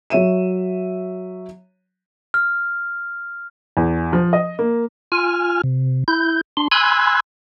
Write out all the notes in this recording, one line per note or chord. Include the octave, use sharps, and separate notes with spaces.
F#3 C#5 E5 D#7 E7
F6
E2
F3
D#5
A#3
F4 G#5 F6
C3
E4 G6
D4 C6
G#5 B5 C6 E6 F#6 G#6